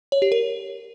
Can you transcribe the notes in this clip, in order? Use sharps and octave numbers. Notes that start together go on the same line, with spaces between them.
C#5
G4
A#4